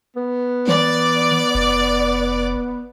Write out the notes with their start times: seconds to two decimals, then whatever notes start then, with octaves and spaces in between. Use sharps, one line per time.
0.16 B3
0.68 E3 D5 D6
1.55 F1